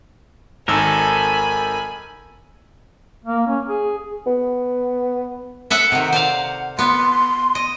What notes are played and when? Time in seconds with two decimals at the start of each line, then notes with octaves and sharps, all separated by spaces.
0.68 G#1 D#3 A4 A#4 G#5 B5 E6
3.25 A#3
3.47 C#4
3.68 G#4
4.27 B3
5.70 A4 E5 F#5
5.92 C3 D#3 F#5
6.13 C5 D5 F5
6.79 B3 C6
7.55 D#5